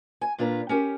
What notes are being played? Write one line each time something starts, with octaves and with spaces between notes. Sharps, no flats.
G#5
A#2 D4 F4 B4 A#5
C#4 G4 A#4